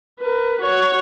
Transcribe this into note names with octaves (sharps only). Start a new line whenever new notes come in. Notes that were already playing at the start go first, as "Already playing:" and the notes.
A#4 B4
F#4 C#5